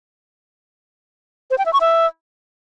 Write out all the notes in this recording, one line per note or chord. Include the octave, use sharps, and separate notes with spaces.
C5
G5
E5
C#6
E5